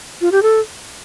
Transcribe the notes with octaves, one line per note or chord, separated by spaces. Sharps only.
F4
G4
A4